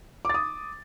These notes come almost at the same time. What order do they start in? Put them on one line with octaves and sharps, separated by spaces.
D6 A6 D#6